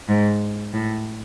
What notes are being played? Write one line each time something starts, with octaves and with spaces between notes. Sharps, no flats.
G#2
A2